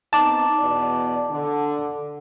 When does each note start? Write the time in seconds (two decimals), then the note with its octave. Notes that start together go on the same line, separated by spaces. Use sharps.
0.13 B3 C4 D#4 A5 D6
0.59 E2 B2 D5
1.31 D3